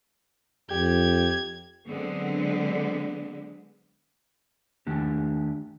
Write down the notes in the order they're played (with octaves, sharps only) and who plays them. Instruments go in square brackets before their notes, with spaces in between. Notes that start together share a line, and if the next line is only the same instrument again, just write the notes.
[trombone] F2 [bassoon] G4 [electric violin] G#6
[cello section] D3 F#3 G#3 B3 C4
[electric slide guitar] D#3 A3 D4 G4